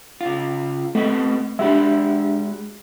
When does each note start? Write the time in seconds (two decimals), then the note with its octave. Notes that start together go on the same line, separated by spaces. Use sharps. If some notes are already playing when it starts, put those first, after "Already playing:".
0.21 C#3 F4
0.95 A3 B3 C4 D#5
1.59 G#3 D4 F#4 G4 E5 B5